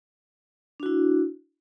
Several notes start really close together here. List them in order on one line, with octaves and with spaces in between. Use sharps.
D4 F#4 E4